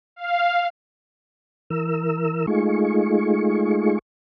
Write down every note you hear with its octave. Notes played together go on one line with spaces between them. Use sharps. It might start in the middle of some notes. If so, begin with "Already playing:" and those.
F5
E3 A#4 E6
G#3 A3 D#4 F4 G#4 C#6